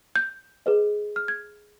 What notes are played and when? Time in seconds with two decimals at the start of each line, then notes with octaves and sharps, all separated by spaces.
0.16 G6
0.66 G#4 B4 D#5
1.16 F6
1.28 G#6